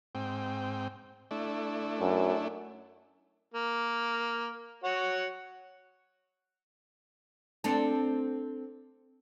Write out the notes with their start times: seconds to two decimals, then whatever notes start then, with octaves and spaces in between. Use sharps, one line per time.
0.15 G#2 C4 G5
1.31 A3 D4 E4
2.01 F#2
3.54 A#3
4.84 F#4 C#5 F#5
7.64 C4 D4 A4